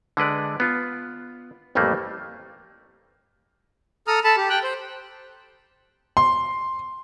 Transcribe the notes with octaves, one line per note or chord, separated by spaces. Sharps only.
D3 G#3 B4 D5
B3 F4
A1 F2 G3 A3 A#3
A4 A#5 D#6 F6
A4 A5 B5
G4
G5 F#6
C5
C6